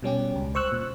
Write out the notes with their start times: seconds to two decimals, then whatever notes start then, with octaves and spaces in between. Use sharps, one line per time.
0.03 B2 G3 C#4 G4
0.35 C#2
0.55 C5 C#6 E6 F#6
0.72 A#2